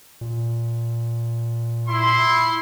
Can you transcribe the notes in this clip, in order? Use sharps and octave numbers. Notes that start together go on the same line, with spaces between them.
A#2
E4 C6